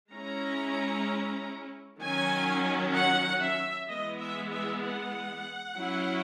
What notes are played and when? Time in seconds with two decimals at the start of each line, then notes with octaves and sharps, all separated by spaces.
0.12 G#3 C#4 E4 A#5
2.00 D#3 F#3 C#4 G#5
2.94 F#5
3.41 E5
3.88 E3 G#3 B3 D#5
4.19 E5
4.51 E5
4.83 F#5
5.77 F#3 C#4 E4